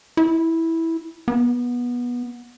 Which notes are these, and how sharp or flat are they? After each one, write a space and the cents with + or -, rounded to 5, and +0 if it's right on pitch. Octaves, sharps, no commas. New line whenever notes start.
E4 -10
B3 -20